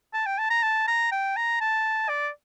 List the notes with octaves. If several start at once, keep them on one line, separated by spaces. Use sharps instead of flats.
A5
G5
A5
A#5
A5
A#5
G5
A#5
A5
D5